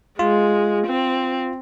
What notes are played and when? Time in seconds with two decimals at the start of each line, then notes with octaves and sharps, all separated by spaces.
0.19 G#3 F4
0.87 C4